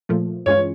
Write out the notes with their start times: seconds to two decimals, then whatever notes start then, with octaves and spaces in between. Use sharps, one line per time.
0.09 A#2 F3 A3
0.46 G2 E3 G#3 C#4 F4 C#5